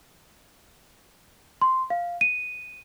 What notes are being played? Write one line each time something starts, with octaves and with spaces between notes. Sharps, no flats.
C6
F5
D#7